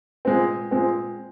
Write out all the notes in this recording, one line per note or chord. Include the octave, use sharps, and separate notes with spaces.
A#2 G#3 C4
A#2 G#3 C4